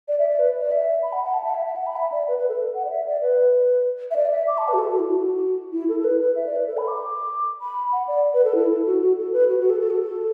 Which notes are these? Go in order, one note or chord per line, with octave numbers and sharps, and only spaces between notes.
D5
E5
D5
B4
D5
E5
B5
F#5
F#5
A5
E5
F#5
E5
E5
F#5
B5
E5
D5
B4
B4
A4
F#5
D5
E5
D5
B4
E5
D5
E5
D6
A5
B4
F#4
A4
F#4
E4
F#4
E4
A4
A4
B4
B4
E5
D5
B4
A4
B5
D6
B5
F#5
D5
B4
A4
E4
A4
F#4
F#4
A4
B4
F#4
F#4
A4
A4
F#4
A4